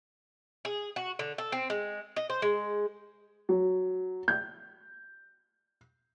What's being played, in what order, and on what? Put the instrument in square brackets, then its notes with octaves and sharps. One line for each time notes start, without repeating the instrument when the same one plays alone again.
[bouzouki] G#4
F#4
D3
A4
C4
G#3
D#5
C5
G#3
[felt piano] F#3
G6